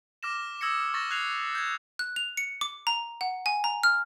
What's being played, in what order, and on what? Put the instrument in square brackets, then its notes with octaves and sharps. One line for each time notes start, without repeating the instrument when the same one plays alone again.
[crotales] D6 F6 A#6 E7
D#6 E6 G#6 A#6 C#7
C#6 A6 A#6 E7
F#6 G#6 C7 F7
G6 G#6
[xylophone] F#6
F7
C#7
D6
A#5
F#5
G#5
A#5
F6